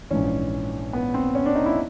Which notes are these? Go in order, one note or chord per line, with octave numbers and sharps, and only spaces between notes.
A#1 G#2 E3 C#4
B3
C4
C#4
D4
D#4
E4